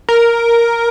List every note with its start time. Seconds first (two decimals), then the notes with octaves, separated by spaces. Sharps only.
0.09 A#4